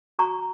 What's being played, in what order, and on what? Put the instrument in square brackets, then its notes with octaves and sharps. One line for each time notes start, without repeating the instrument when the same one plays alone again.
[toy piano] F#4 A#5 C#6